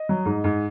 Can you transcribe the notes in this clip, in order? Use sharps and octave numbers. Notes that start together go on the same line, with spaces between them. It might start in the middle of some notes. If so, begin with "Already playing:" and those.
Already playing: D#5
F#3
G#2
G#2